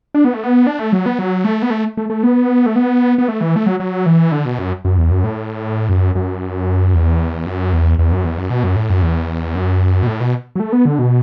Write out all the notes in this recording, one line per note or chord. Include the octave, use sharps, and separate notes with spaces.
D4
B3
A3
B3
D4
A3
F#3
B3
F#3
A3
B3
A3
A3
A3
B3
A3
B3
B3
A3
E3
A3
F#3
F#3
E3
D3
B2
F#2
F#2
E2
F#2
A2
F#2
F#2
E2
F#2
E2
E2
F#2
E2
F#2
B2
F#2
A2
F#2
E2
F#2
B2
A2
B2
F#3
A3
B3
D3
B2